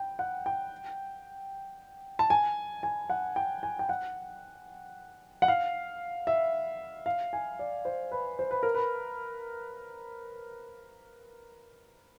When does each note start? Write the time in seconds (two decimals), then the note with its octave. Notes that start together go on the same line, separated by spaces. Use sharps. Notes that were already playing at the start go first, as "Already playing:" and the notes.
Already playing: G5
0.19 F#5
0.46 G5
2.19 A5
2.30 G#5
2.83 G#5
3.10 F#5
3.36 G5
3.63 G#5
3.79 G5
3.89 F#5
5.42 F#5
5.48 F5
6.27 E5
7.06 F5
7.33 G#5
7.59 D5
7.85 C5
8.11 B4
8.39 C5
8.51 B4
8.63 A#4
8.75 B4